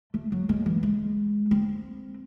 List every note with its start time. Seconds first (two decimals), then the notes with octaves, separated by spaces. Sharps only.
0.14 A3
0.32 F#3
0.49 G#3
0.66 E3
0.83 G#3
1.51 C4